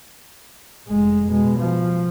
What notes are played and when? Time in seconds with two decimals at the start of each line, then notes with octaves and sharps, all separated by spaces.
0.88 F1 G#3
1.28 B2 G#3
1.60 F3